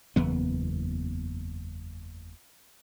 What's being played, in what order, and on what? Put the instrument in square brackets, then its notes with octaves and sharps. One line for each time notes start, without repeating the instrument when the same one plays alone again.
[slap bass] F#1 E2 B3